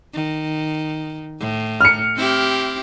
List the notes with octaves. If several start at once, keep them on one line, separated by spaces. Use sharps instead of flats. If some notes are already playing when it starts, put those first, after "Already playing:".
D#3
A2
F6 C#7
C4 E4 G4